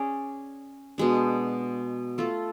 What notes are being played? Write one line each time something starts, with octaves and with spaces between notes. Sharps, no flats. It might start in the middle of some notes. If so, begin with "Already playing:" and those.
Already playing: C#4 G#4 D5
B2 G#3 D4
A3 F4 A4